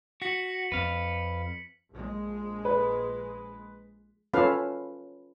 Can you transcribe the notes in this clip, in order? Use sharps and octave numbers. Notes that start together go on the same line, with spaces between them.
F#4 B6 C#7 F#7
F2 C4 B4 F5
A#1 G#3
B4
C#4 F4 A4 B4 F5